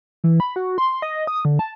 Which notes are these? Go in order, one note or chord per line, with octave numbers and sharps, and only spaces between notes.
E3
B5
F#4
C6
D#5
D#6
D3
A5